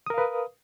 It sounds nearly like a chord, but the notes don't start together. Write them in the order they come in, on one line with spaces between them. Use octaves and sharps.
D#6 A#4 F5 B4